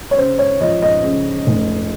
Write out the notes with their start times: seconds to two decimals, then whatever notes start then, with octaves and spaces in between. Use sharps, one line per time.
0.11 C#5
0.17 C#3 C5
0.38 C#5
0.61 F3 D#5
0.82 D#5
1.03 C#3
1.47 F1